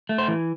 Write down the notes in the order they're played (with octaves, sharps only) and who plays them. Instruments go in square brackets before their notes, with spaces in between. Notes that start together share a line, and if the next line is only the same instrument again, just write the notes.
[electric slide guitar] A3
C5
E3